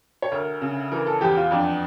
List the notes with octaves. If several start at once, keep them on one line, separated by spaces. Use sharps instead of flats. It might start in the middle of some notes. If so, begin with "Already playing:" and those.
C#5
D2 A#4
C#3
E3 A#4
A4
E2 G4
F4
F2 D4